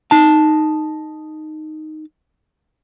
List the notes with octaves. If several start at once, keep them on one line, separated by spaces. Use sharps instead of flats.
D#4 A5